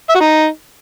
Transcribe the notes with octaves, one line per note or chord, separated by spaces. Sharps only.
E5
F#4
D#4